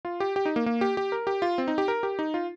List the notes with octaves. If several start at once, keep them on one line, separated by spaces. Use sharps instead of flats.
F4
G4
G4
D#4
A#3
A#3
G4
G4
A#4
G4
F4
C4
D#4
G4
A#4
G4
D#4
F4